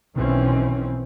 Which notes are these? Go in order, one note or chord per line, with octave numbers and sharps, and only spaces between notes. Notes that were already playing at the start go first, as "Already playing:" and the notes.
B1 B2 D#3 E3 C4 C#4